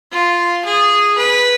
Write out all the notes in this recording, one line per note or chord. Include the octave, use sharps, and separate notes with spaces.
F4
G#4
B4